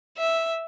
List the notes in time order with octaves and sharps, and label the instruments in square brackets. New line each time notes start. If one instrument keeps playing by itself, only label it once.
[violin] E5